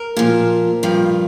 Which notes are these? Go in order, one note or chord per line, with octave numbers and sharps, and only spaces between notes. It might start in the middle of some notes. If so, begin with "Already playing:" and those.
Already playing: A#4
A#2 F3
G2 F3